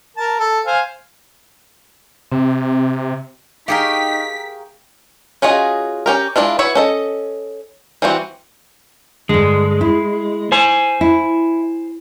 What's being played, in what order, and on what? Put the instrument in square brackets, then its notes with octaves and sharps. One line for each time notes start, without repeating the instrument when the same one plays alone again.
[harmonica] A#4 A5
A4
C5 F5 G#5
[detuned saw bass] C3 [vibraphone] C4
[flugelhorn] D#4 [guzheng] G4 G#4 A#4 [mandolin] F5 G5 C#6 [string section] B6
[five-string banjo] C#4 F4 F#4 G#4 D#5
C#4 G4 A#4
G#3 A3 D4 E4 F4
E4 F#4 B4 C#5 E5
C#4 A4 D#5
E3 G3 C4 F#4
[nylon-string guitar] G2 D3 [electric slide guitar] G#3
[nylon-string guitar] E4
[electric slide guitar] C5 G#5
[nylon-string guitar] E4